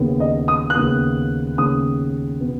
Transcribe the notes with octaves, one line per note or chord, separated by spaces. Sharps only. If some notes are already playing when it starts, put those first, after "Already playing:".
Already playing: D#2 C#3 B3
D#5
D#6
F#6
D#2 C#3 B3 D#6
D#2 C#3 B3 D#6
B2 B3